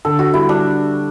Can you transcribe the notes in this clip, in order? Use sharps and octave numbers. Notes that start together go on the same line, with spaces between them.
D3 A4
F#4
G3 E4
D4